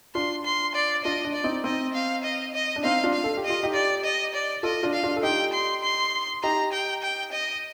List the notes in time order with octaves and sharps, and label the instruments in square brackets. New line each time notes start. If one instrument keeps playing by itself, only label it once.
[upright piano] D4 F4 [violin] C6
[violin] C6
D5
[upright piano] D4 F4 [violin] D#5
[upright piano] D4
[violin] D5
[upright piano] C4 D#4
[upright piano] C4 D#4 [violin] D#5
[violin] F5
D#5
D#5
[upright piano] D4
[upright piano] C4 D#4 [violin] F5
[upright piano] D4 F4
[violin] F5
[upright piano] A4
G4
[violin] D#5
[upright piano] F4
D#4 G4
[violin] D5
D#5
D5
[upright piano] F4 A4 [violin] D#5
[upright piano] D4 F4
[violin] F5
[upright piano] D4 F4
A4
[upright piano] D#4 G4 [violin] G5
[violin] C6
C6
[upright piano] D#4 G4 [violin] A#5
[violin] G5
G5
D#5